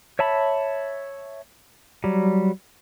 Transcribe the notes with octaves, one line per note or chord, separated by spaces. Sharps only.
C#5 E5 A5 B5
F#3 G3